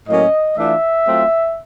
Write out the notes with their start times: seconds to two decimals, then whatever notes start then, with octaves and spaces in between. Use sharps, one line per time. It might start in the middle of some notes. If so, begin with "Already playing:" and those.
0.08 A2 F#3 A#3 C#4 D#5
0.57 E3 A3 D4 F4 E5
1.07 F#3 A3 C4 F4